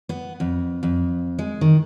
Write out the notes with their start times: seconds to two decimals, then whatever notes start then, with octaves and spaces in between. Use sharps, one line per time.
0.09 B3
0.40 F2
0.83 F2
1.39 G#3
1.61 D#3